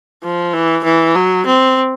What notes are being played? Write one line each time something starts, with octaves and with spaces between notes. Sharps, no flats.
F3
E3
E3
F#3
C4